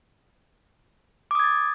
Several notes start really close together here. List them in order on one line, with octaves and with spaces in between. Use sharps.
D6 D#6 G#6 A6